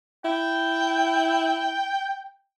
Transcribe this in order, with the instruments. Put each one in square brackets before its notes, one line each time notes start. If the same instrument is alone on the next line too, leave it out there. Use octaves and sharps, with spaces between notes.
[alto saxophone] E4 [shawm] G5